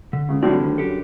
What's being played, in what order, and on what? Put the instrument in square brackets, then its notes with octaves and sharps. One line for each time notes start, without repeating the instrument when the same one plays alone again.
[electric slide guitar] D3
[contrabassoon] C#2 [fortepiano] C#3
[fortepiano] A2 D3 G3 [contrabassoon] F#3 [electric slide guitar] C4 D5
[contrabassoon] D2 [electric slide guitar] D#3
[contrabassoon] F#2 [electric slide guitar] D4 G4 A4